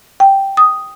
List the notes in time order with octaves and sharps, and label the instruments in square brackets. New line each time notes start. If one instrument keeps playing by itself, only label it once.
[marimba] G5
D#6